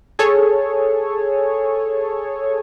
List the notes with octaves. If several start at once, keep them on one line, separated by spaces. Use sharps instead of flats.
G#4 A4 C#5